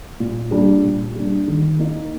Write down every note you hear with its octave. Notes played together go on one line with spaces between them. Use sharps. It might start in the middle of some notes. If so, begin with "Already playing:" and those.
A#2
G3 D4
A#2
G3 D4
D#3
A#3 D#4